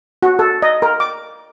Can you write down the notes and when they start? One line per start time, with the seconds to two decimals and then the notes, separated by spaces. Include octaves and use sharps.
0.23 F#4
0.39 A4
0.62 D#5
0.82 A#4
1.00 D6